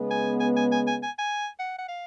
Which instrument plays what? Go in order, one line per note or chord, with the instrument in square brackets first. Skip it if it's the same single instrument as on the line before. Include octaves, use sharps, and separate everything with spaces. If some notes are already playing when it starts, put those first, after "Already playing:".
Already playing: [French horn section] C#3 G#3 B3
[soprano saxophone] G#5
G#5
G#5
G#5
G#5
G#5
G#5
F#5
F#5
F5